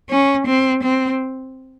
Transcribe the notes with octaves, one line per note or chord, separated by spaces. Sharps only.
C#4
C4
C4